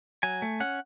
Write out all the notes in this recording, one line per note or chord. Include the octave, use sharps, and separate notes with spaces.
F#3 G#5
A3
C#4 F#5